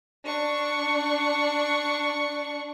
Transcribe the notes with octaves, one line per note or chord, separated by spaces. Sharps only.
D4 C#6